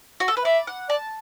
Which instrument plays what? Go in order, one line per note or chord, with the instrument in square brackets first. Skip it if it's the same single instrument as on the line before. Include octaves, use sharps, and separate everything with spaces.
[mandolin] F#4
A4
B4
[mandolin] D5 [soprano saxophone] E5
[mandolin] F#5
[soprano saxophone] D5 [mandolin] A5